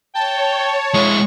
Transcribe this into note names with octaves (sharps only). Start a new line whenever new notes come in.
C#5 G5 A5
G#3 E4 C#6